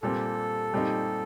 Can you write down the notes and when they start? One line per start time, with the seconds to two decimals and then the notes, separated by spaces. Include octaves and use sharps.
0.02 A#2 G3 C4 A4
0.73 A#2 G3 C4 D#4